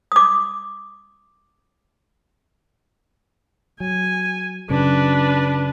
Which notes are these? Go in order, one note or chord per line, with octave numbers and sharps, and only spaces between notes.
D6 D#6
F#3 G#5
F#2 C#3 F#3 D4 B4